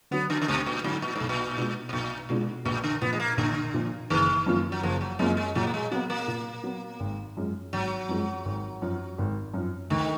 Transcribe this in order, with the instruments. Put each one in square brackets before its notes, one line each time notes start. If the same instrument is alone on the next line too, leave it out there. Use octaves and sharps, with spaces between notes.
[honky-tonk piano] D3 F#3 [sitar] B3
[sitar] D3
D3
[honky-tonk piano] D2 [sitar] B2
[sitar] A#2
[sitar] G#2 [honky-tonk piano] D3 F#3
[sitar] A#2
[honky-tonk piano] B1 [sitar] G#2
[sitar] A#2
[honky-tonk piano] B2 G#3 D4 F4
[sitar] B2
[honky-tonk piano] B1 [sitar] A#2
[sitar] G#2 [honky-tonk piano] B2 G#3 D4 F4
[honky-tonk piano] A#1 [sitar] A#2
[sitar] D3
[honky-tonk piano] A#2 F3 [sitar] B3
[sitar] G#3
A#3
[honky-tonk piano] A#1 [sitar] D3
[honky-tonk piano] A#2 F3
[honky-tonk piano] F#1 [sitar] D#3
[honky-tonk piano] F#2 F3 A#3 F4
[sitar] F#3
[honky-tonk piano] F#1 [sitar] F3
[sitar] F#3
[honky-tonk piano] F#2 F3 A#3 F4 [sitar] G#3
[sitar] G#3
[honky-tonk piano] A#2 [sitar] F#3
[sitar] A#3
G#3
[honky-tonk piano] F#3 B3 [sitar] A#3
[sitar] A#3
[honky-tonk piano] A#2
F#3 B3
G#1
F#2 F3 G#3
[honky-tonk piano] G#1 [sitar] F#3
[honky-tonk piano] F#2 F3 G#3
G#1
F#2 F3
G#1
F#2 F3
[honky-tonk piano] D2 [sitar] D#3